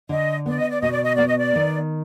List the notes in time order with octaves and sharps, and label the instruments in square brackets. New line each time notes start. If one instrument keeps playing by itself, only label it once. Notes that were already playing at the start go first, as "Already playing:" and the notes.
[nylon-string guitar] D3 [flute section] D#5
[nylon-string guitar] B3 [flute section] D5
[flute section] D#5
D5
[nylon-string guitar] B2 [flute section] D#5
[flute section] D5
D#5
[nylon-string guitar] B3 [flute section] D5
[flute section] D#5
D5
[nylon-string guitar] D#3